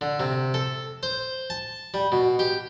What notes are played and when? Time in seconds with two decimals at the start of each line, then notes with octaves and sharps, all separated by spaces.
0.01 D3
0.20 C3
0.54 A4
1.03 C5
1.50 A5
1.94 G3
2.12 B2
2.39 G4